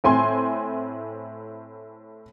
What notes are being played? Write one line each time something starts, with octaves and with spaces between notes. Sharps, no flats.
A2 C4 G#5 C6